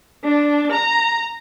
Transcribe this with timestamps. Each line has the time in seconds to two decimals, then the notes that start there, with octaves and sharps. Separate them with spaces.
0.24 D4
0.72 A#5